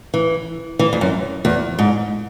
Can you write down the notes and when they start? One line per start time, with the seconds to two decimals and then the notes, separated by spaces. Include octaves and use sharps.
0.14 E3
0.79 E3
0.93 E2
1.01 F#2
1.45 E2
1.79 G#2